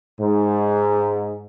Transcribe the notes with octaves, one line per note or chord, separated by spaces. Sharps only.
G#2